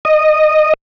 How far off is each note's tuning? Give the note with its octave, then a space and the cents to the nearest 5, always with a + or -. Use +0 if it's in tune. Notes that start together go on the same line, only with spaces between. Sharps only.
D#5 -15